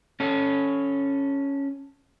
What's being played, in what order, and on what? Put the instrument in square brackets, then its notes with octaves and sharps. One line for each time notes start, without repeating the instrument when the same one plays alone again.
[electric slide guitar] C#4 A4